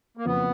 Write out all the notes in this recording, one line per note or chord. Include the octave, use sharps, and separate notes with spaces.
A#3
F#1 F2 C#3 F3 B3